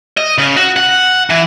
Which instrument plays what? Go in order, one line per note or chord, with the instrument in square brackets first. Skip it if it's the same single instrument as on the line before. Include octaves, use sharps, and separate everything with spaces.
[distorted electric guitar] D#5
C#3
F#4
F#5
E3